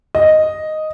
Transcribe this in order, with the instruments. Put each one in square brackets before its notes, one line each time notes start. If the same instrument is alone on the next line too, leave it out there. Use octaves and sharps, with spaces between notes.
[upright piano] D#5